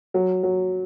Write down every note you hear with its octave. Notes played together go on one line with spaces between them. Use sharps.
F#3
F#3